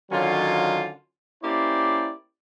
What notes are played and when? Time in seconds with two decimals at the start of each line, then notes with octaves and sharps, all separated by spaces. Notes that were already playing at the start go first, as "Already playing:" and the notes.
0.11 D3 D#3 F#3 C#4 F4
1.42 A#3 C#4 E4 G4 C5 D5